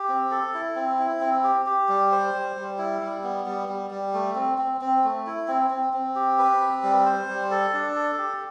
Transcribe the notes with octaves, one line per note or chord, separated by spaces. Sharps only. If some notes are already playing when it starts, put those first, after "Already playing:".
Already playing: G4
C4
A4
E4
C4
E4
C4
G4
G4
G3
C5
G3
G3
E4
G3
B3
G3
G3
G3
A3
C4
C4
C4
A3
E4
C4
C4
C4
G4
B4
C4
G3
C5
G3
A4
D4
A4
G4